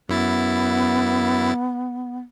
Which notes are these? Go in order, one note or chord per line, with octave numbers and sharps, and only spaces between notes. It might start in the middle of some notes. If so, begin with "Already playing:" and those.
F#2 B3 E4 A6